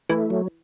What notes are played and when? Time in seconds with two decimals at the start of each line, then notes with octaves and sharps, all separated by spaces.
0.09 E3 A3
0.30 F#3